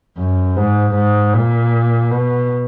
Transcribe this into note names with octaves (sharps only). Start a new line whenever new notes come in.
F#2
G#2
G#2
A#2
B2